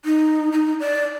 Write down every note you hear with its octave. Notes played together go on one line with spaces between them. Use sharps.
D#4
D#4
D5